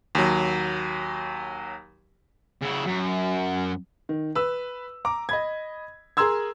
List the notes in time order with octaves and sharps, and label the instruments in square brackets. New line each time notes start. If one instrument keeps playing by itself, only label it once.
[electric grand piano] D#2 F#3
[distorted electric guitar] C#3 E4
F#2
[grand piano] D#3
B4 E6
A#5 D6
D#5 B5 G#6
G#4 A#4 A#5 C6 E6 G#6